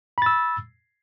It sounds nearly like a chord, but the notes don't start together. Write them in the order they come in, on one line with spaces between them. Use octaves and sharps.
B5 A6 E6